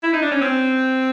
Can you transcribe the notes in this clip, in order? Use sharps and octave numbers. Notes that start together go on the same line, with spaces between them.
E4
D#4
D4
C#4
C4